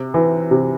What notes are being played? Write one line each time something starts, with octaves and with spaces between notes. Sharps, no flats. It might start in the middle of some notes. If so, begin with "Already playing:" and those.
Already playing: C3
E3
C3